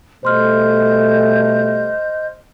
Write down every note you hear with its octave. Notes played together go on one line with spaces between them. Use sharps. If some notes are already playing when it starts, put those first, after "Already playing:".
B2 G3 A3 C5 D#5 C6 F6 G6